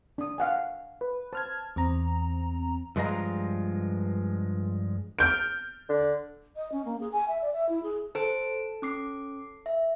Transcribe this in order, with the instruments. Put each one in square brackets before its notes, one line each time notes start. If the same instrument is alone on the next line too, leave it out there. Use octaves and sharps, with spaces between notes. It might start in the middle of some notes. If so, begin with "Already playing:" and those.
[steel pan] D4 D#6
F5 F#5 G#5
[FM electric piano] B4
[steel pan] C5 [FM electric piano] A5 F6 G#6
[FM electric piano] E2 C4 A#5
[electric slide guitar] G2 F3 G#3 F4 D#5 A#5
[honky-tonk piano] F6 G6 D7
[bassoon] D3
[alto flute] D#5
C#4
A#3
G#4
G#5
E5
D5
E5
E4
G#4
[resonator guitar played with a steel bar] A4 [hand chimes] C5 D7
[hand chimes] C#4 D6 C7
E5